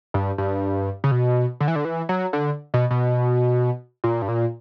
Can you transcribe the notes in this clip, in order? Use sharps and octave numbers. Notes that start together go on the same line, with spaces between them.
G2
G2
C#3
B2
D3
E3
D3
E3
F#3
D3
B2
B2
A#2
G2
A#2